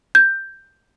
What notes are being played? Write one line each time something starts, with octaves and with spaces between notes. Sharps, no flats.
G6